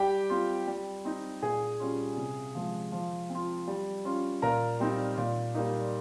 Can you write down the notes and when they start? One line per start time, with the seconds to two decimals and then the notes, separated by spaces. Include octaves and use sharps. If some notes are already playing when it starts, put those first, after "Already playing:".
Already playing: G3 G4 G5
0.30 C4 F4
0.68 G3
1.05 C4 D#4
1.42 A#2 G#4 G#5
1.80 G3 C#4 F4
2.17 C3
2.55 F3 G#3
2.92 F3
3.30 C4
3.35 F4
3.68 G3
4.05 C#4 F4
4.42 A#2 A#4 A#5
4.80 G3 C4 D#4
5.17 A#2
5.55 G3 A#3 D#4